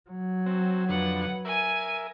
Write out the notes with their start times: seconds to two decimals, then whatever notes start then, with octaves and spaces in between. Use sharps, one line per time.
0.10 F#3
0.46 C4 F#4
0.89 F2 D3 B4 F#5
1.45 A#4 E5 G#5 D#7